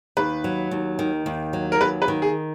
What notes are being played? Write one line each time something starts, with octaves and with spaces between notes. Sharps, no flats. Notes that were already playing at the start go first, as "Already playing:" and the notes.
D#2 B4
F#3
D#2
D#3
D#2
F#3
A#4
D#2 B4
B4
D#3
G#4